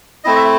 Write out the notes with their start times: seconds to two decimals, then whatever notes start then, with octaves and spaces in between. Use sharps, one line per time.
0.24 A3 C4 E4 D#5
0.36 E5